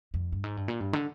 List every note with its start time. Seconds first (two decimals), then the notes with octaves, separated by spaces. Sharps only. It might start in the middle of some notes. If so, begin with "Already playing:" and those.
0.14 F2
0.32 G2
0.44 G#2
0.57 G2
0.68 A#2
0.80 G2
0.93 D3